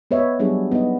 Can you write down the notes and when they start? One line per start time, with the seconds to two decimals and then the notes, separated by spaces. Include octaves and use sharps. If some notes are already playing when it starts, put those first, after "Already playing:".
0.11 B3 B4 C#5 D#5 E5
0.39 F#3 G3 B3 D4 G#4
0.72 B3 D#4 D#5